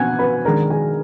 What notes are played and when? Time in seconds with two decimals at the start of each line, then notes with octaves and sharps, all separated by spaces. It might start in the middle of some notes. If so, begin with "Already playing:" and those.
Already playing: B2 F#5 G#5 F#6 G#6
0.19 B4 B5
0.45 D#3 G#3 D4 A#4 A#5
0.70 G#4 G#5